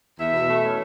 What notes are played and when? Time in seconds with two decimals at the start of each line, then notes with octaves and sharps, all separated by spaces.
0.19 E2 E5
0.33 B2
0.48 A3
0.64 C#4